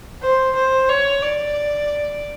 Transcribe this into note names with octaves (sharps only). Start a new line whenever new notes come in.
C5
C5
C#5
D5